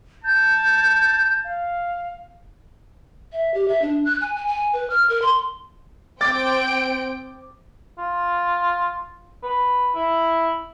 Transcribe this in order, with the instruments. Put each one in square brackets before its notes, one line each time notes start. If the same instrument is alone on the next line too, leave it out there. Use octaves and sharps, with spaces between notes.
[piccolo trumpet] A5 [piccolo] G6
[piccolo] F5
[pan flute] E5
G4
E5
D4
F#6
G#5
G#5
G#5
B4
F6
A#4
C6
[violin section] C4 G5 D7 [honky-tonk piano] D6 A6
[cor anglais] F4
B4
E4